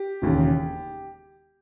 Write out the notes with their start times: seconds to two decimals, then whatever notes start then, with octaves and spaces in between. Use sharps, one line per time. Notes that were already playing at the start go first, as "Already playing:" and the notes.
Already playing: G4
0.22 E1 D#2 C#3